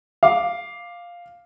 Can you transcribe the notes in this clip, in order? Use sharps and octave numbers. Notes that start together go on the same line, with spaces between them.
F5 D6